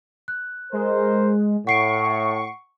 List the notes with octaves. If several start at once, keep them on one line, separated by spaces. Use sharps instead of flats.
F#6
G#3 A#4 C5
A2 F#5 C#6 C7 D7